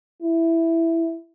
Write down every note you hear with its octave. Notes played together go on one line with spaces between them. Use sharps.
E4